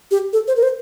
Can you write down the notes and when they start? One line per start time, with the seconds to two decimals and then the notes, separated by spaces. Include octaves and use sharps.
0.11 G4
0.33 A4
0.48 C5
0.56 A#4
0.63 C5